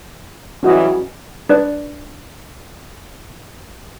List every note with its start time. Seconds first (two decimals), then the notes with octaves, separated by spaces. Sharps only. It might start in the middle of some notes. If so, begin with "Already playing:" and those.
0.63 E3 F#3 G3 C#4 F#4 D#5
1.49 D4 B4 D5